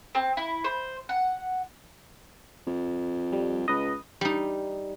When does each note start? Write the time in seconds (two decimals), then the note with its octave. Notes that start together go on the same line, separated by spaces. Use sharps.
0.15 C4
0.37 E4
0.64 C5
1.09 F#5
2.67 F2
3.33 G3
3.68 C#2 B4 D#5
4.21 G3 D#4